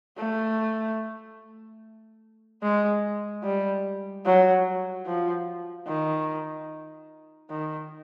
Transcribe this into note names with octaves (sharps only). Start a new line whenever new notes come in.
A3
G#3
G3
F#3
F3
D#3
D#3